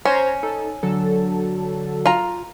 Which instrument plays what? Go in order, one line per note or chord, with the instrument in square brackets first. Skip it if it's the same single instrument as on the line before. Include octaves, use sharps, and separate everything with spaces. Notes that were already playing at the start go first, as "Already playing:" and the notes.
[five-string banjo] C#4 [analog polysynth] C5 A#5 G#6
[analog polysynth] D#4 A4
D3 F#3 A4
[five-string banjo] F4 A#5